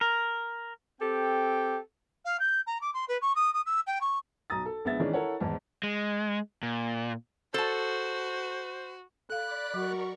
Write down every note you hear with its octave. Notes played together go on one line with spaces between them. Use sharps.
A#4
C4 G4 A4 G5
F5
G6
A#5
D6
C6
B4
C#6
D#6
D#6
E6
G5
C#6
B1 A#5 D#6 A6
A4
A#1 G#3 B3 E5 A6
D#3 E3 G#3 C#4 D4
E4 A4 A#4 C#5 F#5
G#1 E2 G#2 A5
G#3
A#2
F#4 A4 C5 A5
A4 D5 F5 B5 F#6
F#3 F#4 A#4 C#6